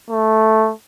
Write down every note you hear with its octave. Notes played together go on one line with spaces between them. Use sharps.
A3